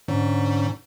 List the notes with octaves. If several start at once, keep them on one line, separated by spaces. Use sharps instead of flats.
G#2 D3 C#4